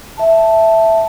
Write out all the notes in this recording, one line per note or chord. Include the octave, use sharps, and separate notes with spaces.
E5 A5